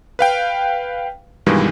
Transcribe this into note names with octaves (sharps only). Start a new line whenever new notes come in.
B4 F5 G5
G2 B2 D#3 E3 G3 G#3